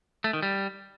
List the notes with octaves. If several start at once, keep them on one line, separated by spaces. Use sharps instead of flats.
A3
D#3
G3